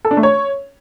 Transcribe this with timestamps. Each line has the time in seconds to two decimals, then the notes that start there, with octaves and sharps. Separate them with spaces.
0.05 A4
0.11 D4
0.17 A3
0.23 C#5